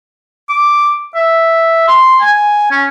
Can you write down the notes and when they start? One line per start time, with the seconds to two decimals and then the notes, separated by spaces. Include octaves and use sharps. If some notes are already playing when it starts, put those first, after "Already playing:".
0.49 D6
1.15 E5
1.88 C6
2.21 G#5
2.71 C#4